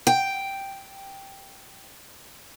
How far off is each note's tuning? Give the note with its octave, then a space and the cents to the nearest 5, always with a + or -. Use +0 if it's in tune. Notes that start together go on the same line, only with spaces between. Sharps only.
G5 +0